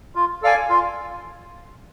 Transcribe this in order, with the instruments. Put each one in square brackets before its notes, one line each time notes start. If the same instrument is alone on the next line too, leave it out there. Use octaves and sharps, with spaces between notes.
[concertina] F4
A4 D5 F5 G#5
F4